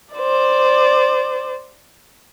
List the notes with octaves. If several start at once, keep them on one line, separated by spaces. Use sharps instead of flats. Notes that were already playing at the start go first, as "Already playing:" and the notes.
C5 D5